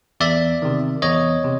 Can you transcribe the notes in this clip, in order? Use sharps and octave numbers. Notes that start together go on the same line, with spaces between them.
E2 D5 E5
C3 D#3
E2 C#5 D#5
C3